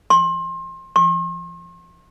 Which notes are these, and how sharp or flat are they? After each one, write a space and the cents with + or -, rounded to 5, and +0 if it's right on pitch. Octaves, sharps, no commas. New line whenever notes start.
C6 +30
C6 +45